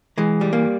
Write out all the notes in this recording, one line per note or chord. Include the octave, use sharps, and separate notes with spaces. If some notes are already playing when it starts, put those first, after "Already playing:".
E3 G#3
G3
A#3